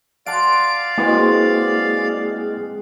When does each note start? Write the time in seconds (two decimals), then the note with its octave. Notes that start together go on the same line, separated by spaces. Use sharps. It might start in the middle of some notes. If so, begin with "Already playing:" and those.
0.26 D5 F5 F#5 A5 C6 D7
0.98 G#3 A#3 C4 E4 F#4 B4